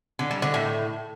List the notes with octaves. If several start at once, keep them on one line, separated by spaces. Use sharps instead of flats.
D3
G3
D3
A2